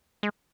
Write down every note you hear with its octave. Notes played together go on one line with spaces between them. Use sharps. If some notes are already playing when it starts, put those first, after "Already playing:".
G#3